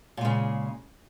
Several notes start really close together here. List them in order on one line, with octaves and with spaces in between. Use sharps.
A#2 G#3 C#3